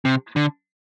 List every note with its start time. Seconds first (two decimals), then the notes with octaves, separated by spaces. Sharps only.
0.05 C3
0.36 D3